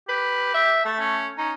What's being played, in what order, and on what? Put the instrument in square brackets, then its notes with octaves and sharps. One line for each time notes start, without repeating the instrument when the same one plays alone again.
[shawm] G4 [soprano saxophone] B4
[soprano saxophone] E5
[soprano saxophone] A3 [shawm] A5
[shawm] C#4
[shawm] C#4 [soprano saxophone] D#4